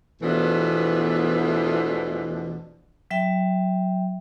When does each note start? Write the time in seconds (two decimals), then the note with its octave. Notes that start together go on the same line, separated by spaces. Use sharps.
0.22 E2 B2 E3 F3 A3 D4
3.11 F#3 E5 G5